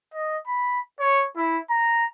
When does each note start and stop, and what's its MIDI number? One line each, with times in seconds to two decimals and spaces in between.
0.13 0.37 75
0.46 0.79 83
0.99 1.25 73
1.36 1.58 64
1.70 2.07 82